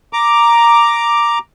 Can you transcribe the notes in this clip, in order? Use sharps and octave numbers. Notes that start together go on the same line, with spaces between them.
A#5 D6